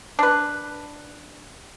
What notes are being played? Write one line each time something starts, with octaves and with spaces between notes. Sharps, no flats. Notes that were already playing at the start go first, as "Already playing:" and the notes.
D4 B4